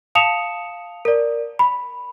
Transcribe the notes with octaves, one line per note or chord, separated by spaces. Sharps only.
F5 A5 D#6 C#7 E7 F7
A#4 D5
B5